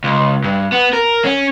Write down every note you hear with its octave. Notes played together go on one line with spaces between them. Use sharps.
C#2
G2
B3
A#4
C#4